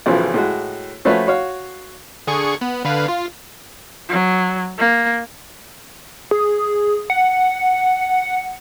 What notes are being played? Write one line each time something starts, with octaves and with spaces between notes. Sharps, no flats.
B1 A2 C#3 E3 F3
A2 G#3 F#4
F3 A3 C#4 F#4 B4 C#5
F#4 C#5 F5
D3 G#4 C#6
B3
D3 B4 F5
F4
F#3
A#3
G#4
F#5